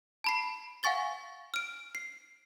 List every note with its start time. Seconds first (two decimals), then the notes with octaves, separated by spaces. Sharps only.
0.24 A5 B5 C7
0.83 F5 F#5 G#5 C#6 A6 G7
1.54 F6 D7
1.95 C7